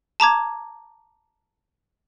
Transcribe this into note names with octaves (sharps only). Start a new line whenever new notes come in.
A5 A#5 D6 G#6